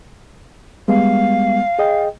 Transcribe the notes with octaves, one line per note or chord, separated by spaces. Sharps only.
G3 G#3 B3 F5
G#4 D#5 G5